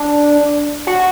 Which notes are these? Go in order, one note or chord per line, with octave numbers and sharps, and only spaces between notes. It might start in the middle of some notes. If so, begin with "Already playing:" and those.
Already playing: D4
F#4